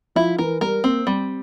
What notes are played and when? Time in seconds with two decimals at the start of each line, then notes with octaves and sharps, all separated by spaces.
0.16 F3 E4
0.38 E3 A#4
0.61 G3 A#4
0.84 A#3 C4
1.07 G3 C4